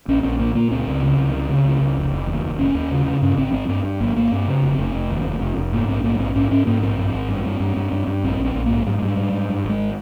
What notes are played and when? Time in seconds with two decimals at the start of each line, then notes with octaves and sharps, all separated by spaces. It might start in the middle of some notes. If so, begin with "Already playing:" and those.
0.08 A#1 C#4
0.23 A#1 C4
0.39 A#2 A#3
0.55 A#2 A#3
0.71 C#2 C4
0.87 C#2
1.03 C#3
1.18 C#2
1.33 C#3
1.49 C#3
1.65 C#2
1.81 C#2
1.97 F1
2.13 F1
2.27 D#2
2.44 F1
2.59 F1 C#4
2.75 D#2
2.91 C#3
3.06 C#3
3.22 G2 C#4
3.37 G#1 C4
3.53 G#1 C4
3.68 G2 C4
3.84 G2
4.00 G#1 A#3
4.16 G#1 A#3
4.31 G2 C4
4.47 C#3
4.62 F1
4.79 F1
4.95 F1
5.10 D#2
5.25 F1
5.41 F1
5.57 F1
5.73 G#2 A#3
5.88 A#1 C4
6.04 G#2 A#3
6.20 A#1 C4
6.35 G#2 C#4
6.51 G#2 C#4
6.67 G#2 A#3
6.81 A#1 C4
6.99 G2
7.13 G#1
7.29 G2
7.46 G2
7.60 G2
7.76 G2
7.92 G2
8.07 G2
8.24 A#1 C4
8.39 A#1
8.44 C4
8.55 A#1
8.66 G#2 A#3
8.86 G#2 G3
8.95 G#3
9.02 G#2 G3
9.17 G#2
9.33 G#2
9.49 G2
9.64 G#1
9.69 G#3